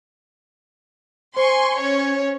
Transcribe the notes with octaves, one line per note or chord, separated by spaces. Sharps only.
C5 G#5 C6 C#6
C#4 C#5